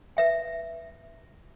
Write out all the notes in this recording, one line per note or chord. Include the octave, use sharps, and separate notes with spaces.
B4 E5 G5